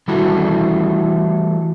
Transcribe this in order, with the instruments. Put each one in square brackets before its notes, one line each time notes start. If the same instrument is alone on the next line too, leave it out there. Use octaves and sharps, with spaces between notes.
[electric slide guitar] E3 G3 A3 E4 F#4 A4